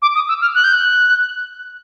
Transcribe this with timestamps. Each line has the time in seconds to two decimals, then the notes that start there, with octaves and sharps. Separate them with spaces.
0.02 D6
0.15 D#6
0.29 E6
0.41 F6
0.55 F#6
0.64 G6
0.73 F#6